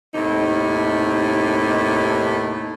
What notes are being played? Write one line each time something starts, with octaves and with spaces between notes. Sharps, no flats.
D#2 A2 C3 D#4